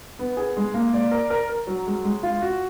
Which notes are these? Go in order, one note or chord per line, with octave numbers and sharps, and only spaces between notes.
B3
G#4
G#3
A#3
D5
A#4
A#4
A#4
F#3
G#3
G#3
F4
F#4